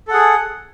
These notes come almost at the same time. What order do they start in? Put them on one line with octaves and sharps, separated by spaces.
A4 F#5 G#4